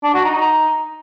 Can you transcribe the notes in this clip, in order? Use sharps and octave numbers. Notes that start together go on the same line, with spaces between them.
D4
F#4
D#4
D#4